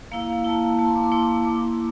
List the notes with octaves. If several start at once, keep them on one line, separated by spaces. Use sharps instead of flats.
A#3 E4 F5
A#3 E4 A5
A#3 E4 A5
C6
D6
C6
A#3 E4 D6
A#3 E4 D6